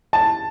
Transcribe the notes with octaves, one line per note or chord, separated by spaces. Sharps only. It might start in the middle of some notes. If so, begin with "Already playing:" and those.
A5